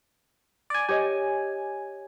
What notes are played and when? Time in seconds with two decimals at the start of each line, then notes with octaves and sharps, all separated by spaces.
0.70 D5 G#5
0.89 G4 C#5 D#5 G#5